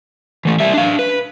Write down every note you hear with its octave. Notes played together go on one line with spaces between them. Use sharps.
E3 A3
G3 E5
D4 F5
B4